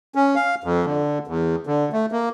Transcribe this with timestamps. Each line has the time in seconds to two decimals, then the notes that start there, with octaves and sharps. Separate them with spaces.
0.15 C#4
0.35 F5
0.64 F2
0.86 D3
1.28 E2
1.67 D3
1.93 A3
2.12 A#3